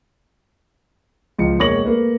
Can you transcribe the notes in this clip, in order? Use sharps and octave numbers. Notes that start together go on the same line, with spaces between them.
C#2 F3 C#7
E1 A#3 C#5 C#6 A#6 F#7
A3 A#3 B4